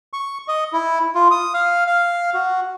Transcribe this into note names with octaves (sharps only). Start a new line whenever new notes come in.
C#6
D#5
E4
F4
D#6
F5
F5
F#4